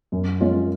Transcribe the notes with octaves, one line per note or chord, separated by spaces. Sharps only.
F#2
F3 G#3 C#4 F4